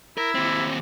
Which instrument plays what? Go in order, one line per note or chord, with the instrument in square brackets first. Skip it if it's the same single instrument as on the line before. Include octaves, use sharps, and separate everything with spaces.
[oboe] E4 [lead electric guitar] A#4
[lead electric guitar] D#2 C4